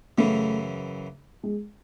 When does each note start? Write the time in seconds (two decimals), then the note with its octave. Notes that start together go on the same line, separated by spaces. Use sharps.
0.18 F#2 C#3 E3 A3
1.43 G#3